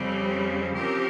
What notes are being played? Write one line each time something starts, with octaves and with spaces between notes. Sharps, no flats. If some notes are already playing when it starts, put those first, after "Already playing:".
Already playing: F2 C#3 G3 C4
C#3 F3 C4 G4 A#4